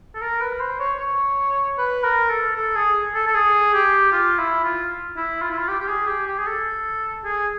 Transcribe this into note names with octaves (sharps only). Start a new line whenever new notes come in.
A4
A#4
B4
C5
C#5
C#5
B4
A#4
A4
A4
G#4
A4
A4
G#4
G4
F4
E4
F4
E4
F4
E4
F4
G4
G4
G#4
G4
G4
G#4
A4
G#4